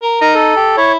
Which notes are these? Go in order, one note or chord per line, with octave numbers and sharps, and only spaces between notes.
A#4
D#4 A#4 A#5
A4
G4
E4 C#5